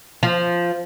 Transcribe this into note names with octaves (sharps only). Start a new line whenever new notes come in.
F3